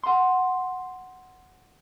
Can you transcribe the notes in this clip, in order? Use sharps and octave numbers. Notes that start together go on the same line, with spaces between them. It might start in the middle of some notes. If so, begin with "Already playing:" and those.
F#5 C6